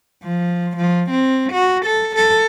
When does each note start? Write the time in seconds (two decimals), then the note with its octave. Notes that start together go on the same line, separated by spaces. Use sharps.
0.23 F3
0.77 F3
1.11 C4
1.53 F#4
1.86 A4
2.15 A4